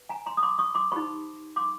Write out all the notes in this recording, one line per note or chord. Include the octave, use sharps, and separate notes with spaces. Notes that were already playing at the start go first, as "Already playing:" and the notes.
Already playing: B4
G#5 A#5
A#5 C6
D#6
C6 D6
C#6 D#6
C6 D6
D#4 G4 C5 B5 C#6
C6 D6